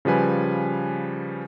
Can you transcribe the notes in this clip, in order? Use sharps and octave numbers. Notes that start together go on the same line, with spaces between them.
C#3 F3 G3 B4 G#5